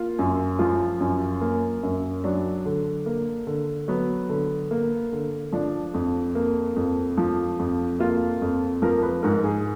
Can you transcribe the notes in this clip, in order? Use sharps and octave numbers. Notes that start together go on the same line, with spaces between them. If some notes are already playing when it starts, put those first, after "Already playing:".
Already playing: A#3 F4
F#2
F3 F4
F#2
A#3
F#2
F#3 D4
D3
A#3
D3
F#3 B3
D3
A#3
D3
F3 D4
F2
A#3
F2
F3
F2
A#3 F4
F2
F3 A#4
B4
G#2 A#4
G#4